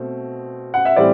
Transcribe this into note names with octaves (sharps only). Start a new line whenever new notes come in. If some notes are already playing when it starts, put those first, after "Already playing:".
Already playing: B2 A3 C4
F#5
E5
A2 E3 G3 C4 D5